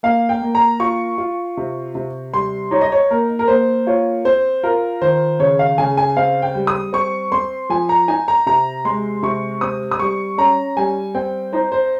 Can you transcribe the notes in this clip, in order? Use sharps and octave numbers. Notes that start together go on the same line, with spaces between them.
A#3 F5
G5
A#3
A#5
F4 C#6
F4
C3
C3
G3 C6
D#4 C#5
D#5
C#5
A#3 A#4
A#4
A#3 C5
F4 C#5
C4 C5
F4 A#4
D#3 C5
C#3 C#5
F5
C#3 G#5
G#5
C4 F5
G5
G3
D#6
C4 C#6
C4 C6
F3 G#5
A#5
D#4 G#5
A#5
C3 A#5
G#3 C6
C3 C#6
C4 D#6
D#6
G3 C#6
C#4 A#5
G3 G#5
C4 G5
D#4 C5
C5